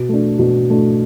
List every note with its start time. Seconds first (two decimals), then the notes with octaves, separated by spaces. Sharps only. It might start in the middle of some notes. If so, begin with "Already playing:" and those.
Already playing: B2
0.09 A3 D4
0.39 B2
0.70 A3 D4